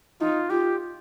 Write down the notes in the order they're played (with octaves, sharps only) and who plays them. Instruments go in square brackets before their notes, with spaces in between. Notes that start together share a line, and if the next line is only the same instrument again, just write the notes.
[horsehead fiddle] D#4 [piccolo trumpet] F4
[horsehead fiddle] F4 [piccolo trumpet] G4